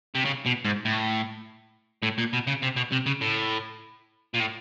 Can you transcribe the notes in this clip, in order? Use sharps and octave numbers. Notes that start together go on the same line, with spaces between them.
C3
C#3
B2
G#2
A2
A2
A#2
B2
C#3
C3
B2
C3
C#3
A2
A#2
A2